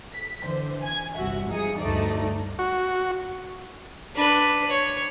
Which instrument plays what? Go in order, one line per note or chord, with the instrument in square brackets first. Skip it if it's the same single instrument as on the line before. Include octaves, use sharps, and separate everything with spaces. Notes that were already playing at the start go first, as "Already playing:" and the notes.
[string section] B6
D3 E3 C5
G#5 G#6
G1 C2 F#4 E5
F3 D#4 G#4 D#6 C#7
D2 G2 A3 D#4 D5
[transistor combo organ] F#4
[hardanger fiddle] D4 B4
C#5